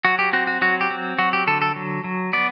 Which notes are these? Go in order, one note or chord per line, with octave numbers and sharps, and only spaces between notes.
F#3 F#4
G4
C4 F#4
F#4
F#3 F#4
G4
C4
F#3 F#4
G4
D3 A4
A4
F#3
F#3
B3 D5